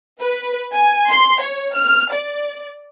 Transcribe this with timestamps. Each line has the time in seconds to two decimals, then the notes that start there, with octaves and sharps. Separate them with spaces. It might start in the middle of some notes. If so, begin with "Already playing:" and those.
0.21 B4
0.74 G#5
1.10 C6
1.42 C#5
1.76 F6
2.13 D5